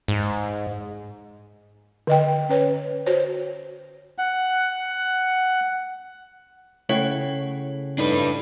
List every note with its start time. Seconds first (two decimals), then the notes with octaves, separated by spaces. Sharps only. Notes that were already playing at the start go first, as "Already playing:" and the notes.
0.08 G#2
2.07 D3 D#5 G5
2.49 C#4 B4 C#5
3.06 F#4 C5 C#5
4.18 F#5
6.89 C#3 A3 E4 C#5 F#5 G5
7.98 A2 D4 D#4 B4